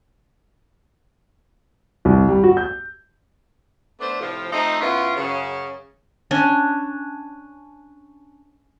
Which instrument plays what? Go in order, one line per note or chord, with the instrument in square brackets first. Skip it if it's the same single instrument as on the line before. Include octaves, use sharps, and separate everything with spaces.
[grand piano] C2
G3
F#4
G6
[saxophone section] A3 B3 D4 C5 D5
A2 C3 F3
F3 A3 C4 D#4
F#2 B3 C#4 E4 F4
F#2 C#3
[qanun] C#4 D4